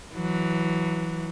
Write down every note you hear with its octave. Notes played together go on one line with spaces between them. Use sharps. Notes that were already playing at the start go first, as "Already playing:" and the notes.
E3 F#3